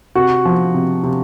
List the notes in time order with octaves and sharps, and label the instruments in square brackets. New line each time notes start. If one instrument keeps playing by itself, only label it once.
[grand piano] C3 F#4
F3
C3
C3